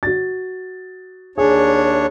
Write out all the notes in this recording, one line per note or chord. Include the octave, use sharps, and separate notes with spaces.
F#4 A6
D#2 D4 G#4 C#5